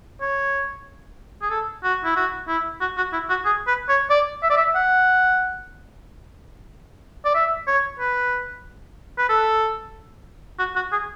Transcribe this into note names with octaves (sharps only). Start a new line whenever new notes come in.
C#5
G#4
A4
F#4
E4
F#4
E4
F#4
F#4
E4
F#4
G#4
B4
C#5
D5
E5
D5
E5
F#5
D5
E5
C#5
B4
B4
A4
F#4
F#4
G#4